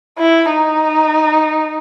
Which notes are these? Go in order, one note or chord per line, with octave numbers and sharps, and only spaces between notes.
E4
D#4